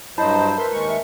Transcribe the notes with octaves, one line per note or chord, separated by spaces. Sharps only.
G2 F#3 E4 C5 D#5 A5 B5
A5
A#4 B4 E5 C6
D#2 G#3 C#6
E5